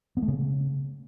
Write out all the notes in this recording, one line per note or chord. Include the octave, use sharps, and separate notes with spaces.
B3
A3
C#3